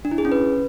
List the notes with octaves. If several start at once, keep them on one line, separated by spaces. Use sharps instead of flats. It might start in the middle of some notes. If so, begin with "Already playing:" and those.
D4
E4
G#4
C#4
B4